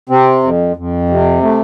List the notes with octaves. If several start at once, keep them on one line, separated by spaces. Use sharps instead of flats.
C3 C4
F2
F2
C3
A3